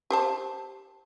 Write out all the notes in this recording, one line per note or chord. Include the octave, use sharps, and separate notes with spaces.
G4 C5 A5